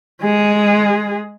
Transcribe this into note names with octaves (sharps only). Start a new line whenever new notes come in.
G#3 G#4